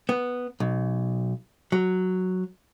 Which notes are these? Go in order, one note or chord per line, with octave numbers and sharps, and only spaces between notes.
B3
B1
F#3